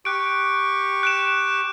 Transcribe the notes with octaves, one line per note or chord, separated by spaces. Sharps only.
G4 C#6 F#6 D7
F#6 D7 E7